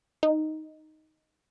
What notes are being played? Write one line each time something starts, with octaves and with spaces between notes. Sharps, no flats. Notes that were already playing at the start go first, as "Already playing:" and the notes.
D#4